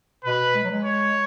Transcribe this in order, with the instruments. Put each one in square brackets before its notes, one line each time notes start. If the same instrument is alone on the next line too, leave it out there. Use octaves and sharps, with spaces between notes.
[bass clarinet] B2 [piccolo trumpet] B4
[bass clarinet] G#3
F#3
G#3
[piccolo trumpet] C#5